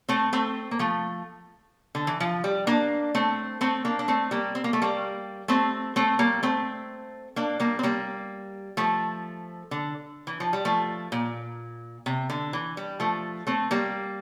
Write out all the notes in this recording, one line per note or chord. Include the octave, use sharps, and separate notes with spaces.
A3 C4
A3 C4
A#3
F3 A3
D3
E3
F3
G3
A#3 D4
A3 C4
A3 C4
A#3 D4
D4
A3 C4
G3 A#3
C4
A#3
A3
G3 A#3
A3 C4
A3 C4
G3 A#3
A3 C4
A#3 D4
G3 A#3
C4
G3 A#3
F3 A3
D3
E3
F3
G3
F3 A3
A#2
C3
D3
E3
G3
F3 A3
A3 C4
G3 A#3